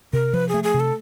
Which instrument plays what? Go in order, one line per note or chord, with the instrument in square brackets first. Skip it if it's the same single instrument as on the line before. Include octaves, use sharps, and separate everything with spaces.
[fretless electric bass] C3 [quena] A#4
[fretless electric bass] F3 [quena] B4
[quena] G#4
[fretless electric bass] A3
[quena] G#4
[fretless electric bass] C3
[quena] A4